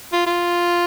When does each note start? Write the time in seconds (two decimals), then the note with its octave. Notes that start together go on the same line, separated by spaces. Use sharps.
0.13 F4
0.27 F4